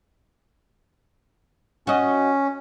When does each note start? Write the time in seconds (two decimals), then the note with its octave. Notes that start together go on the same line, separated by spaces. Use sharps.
1.87 C#4 F#4 D#5